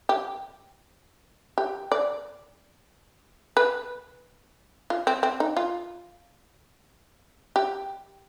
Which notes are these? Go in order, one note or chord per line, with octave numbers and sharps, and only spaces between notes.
G4
G4
D5
B4
F4
C4
C4
D#4
F4
G4